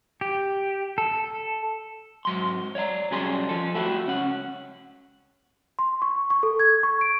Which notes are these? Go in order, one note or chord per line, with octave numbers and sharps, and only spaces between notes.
G4
A4
G#2 F#3 C6
C#5 D5 E5 A#5
B1 F#3 G3 C#4 G#4 C6
F3 A4
A3 E4 F#4 G4
C#2 C#4 F#5
C6
C#6
C#6
A4
G#6
C#6
D7